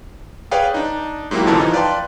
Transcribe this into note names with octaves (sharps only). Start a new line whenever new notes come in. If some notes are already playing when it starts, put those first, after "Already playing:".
G#4 B4 C#5 D5 F5 G5
D4 D#4
G#2 F#3 A#3 E4 G4
B1 F#2 A#2 D3 E3 A5
E3 F3 D#4
B4 D5 F5 G5 A5 C6